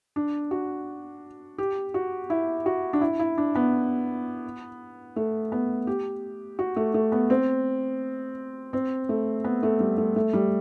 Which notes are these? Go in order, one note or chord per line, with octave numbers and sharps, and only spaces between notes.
D4
F#4
G4
F#4
E4
F#4
D4
E4
E4
D4
B3
A3
B3
G4
F#4
A3
A3
B3
C4
C4
A3
B3
A3
G3
A3
A3
G3